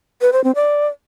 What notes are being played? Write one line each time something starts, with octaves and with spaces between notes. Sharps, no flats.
B4
C5
C4
D5